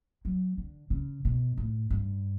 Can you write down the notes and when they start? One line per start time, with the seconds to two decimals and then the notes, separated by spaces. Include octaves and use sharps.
0.25 F#3
0.57 D3
0.90 C#3
1.25 B2
1.57 A2
1.90 G2